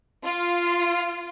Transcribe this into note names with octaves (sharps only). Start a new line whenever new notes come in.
F4